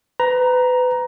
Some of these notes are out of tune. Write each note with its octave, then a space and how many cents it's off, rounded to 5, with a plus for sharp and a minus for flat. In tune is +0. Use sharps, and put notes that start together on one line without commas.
B4 +30 A#5 +10